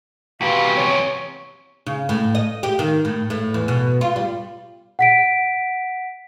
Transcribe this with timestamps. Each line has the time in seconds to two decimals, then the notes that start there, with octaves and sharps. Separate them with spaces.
0.41 E2 C3 F#4 G4 B4 F5
0.77 C#5 C#6
1.87 C#3
2.09 A2
2.35 D#5
2.63 G4
2.79 D#3
3.05 A2
3.30 A2
3.54 E2
3.68 B2
4.01 F4
4.16 G3
4.99 F#5 B6 D7